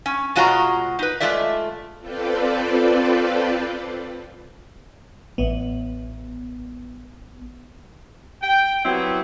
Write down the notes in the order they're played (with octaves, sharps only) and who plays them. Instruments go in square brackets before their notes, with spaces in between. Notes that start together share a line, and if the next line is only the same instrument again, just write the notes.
[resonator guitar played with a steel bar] C#4
B2 G#3 F4 F#4 C#5 A#5
D#4 B4
G#3 A3 F4 D5 E5
[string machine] C4 F4 A4 B4 C5 D5
[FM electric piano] A1 B3
[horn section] G5
F#3 B3 C4 E4 G4